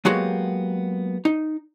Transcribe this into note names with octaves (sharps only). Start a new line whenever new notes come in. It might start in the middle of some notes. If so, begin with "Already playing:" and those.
F#3 G#3 A#3 B3 F#4 G4
D#4